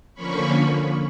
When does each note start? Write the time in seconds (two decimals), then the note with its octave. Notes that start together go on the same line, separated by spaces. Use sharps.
0.14 D3 F3 A#3 C#4 B5 C#6